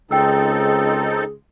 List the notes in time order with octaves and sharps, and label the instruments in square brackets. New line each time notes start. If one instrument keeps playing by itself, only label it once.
[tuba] C#2 [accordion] C4 D#4 A4 [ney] G#4 [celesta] G5 E6